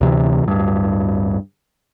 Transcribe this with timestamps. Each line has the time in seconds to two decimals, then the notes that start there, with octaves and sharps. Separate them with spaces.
0.01 D2 C3 E3
0.44 D1 G2